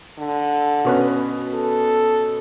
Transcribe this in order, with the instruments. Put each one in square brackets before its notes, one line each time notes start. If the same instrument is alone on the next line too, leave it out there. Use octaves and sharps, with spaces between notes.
[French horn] D3
[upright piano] B2 C#4 B4
[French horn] A4